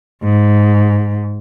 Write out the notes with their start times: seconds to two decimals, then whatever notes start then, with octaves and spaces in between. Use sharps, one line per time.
0.23 G#2